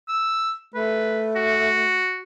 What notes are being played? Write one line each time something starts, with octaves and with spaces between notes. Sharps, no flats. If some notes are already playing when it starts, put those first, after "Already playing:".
E6
A3 B4
F#4